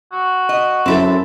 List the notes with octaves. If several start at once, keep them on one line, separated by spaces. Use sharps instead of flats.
F#4
D#5
F#2 C4 E4 A4